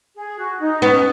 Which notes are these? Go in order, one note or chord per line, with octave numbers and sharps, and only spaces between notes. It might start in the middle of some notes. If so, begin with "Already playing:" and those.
G#4
F#4
D#4
B3 C#4